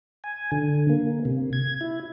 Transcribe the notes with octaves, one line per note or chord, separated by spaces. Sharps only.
G#5
D3
A#3
C3
G#6
E4